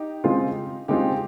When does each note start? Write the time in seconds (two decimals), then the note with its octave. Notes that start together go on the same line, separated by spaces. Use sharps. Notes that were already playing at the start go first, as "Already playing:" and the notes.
Already playing: D#4 G4
0.24 C#3 G#3 C4 F4
0.88 C#3 G#3 C4 D#4 F4 G4